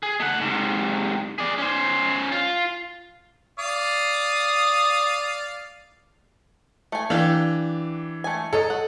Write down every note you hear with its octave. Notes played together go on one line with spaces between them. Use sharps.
G#4
A3 F#5
G#2 C3
G#4 D5
C#4 C5
F4
D5 F5 D#6
A3 G#5
E3 D4 G4 F5
A3 G#5
F#3 A4 C#5 D#5
F#5